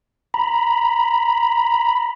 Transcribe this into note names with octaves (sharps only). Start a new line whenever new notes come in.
A#5 B5